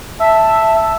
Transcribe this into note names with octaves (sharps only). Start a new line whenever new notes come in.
E5 A5